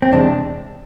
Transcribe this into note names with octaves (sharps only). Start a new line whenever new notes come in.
C4
E2 C3 G#3 D4